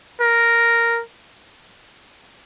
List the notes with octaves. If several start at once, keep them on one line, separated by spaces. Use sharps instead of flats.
A#4